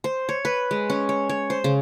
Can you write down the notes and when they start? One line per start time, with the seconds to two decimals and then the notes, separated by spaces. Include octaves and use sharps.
0.04 C5
0.29 C#5
0.45 B4
0.71 G#3
0.90 C#4
1.09 C#5
1.29 C#5
1.50 C5
1.64 C#3